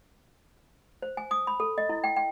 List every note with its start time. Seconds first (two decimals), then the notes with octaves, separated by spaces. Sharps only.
1.02 C5
1.17 G#5
1.31 D#6
1.47 B5
1.60 A4
1.78 D#5
1.89 E4
2.04 G5
2.16 G5